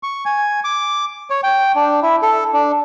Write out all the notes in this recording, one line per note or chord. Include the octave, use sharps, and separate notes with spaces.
C#6
G#5
D6
C#5
G5
D4
E4
A4
D4